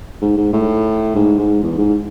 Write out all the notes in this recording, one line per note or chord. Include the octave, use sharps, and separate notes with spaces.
G#2
G#2
A2
G#2
G#2
E2
G#2